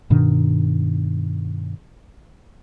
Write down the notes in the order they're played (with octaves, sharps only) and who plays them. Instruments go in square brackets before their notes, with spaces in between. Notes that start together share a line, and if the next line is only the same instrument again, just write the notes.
[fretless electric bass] G2 B2 D#3 D4